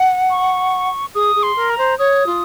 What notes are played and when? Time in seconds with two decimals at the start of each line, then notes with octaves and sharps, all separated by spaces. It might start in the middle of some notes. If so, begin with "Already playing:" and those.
Already playing: F#5
0.30 C#6
1.15 G#4 D#6
1.35 G#4
1.43 C6
1.56 A#4
1.70 A#5
1.78 C5
1.98 C#5 D#6
2.26 F4